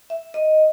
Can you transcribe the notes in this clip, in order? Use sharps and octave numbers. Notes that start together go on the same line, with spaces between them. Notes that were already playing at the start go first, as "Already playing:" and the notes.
E5
D#5